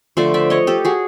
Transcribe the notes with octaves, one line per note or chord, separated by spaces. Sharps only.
D3 F3 A3 C5 D5
D5 E5
C#5 D#5
G4 A4
F#4 G#4